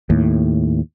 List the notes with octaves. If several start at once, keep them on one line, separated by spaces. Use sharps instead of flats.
D#2 A2